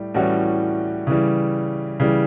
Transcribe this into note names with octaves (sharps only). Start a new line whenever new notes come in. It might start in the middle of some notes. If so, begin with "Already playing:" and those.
Already playing: A2 G3
A2 E3 G3 C#4 F#4
C#3 E3 G3
C#3 E3 G3